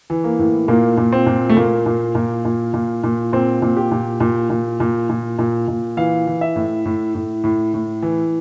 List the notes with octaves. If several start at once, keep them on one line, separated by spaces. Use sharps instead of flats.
E3
A#3
A2
A#2 A#3
A#2
C4
A#2
A3
A#2 A#3
A#2
A#2
A#2
A#2
A#2
A#2 C4
A#2
G4
A#2
A#2
A#2
A#2
A#2
A#2
A#2
E3 F5
E3
E5
A2
A2
A2
A2
A2
E3